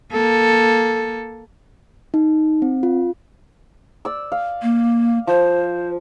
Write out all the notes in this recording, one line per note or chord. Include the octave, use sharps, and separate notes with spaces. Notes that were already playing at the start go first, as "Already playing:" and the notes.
A#3 A4
D#4
C4
F4
D5 E6
F5
A#3
F3 C5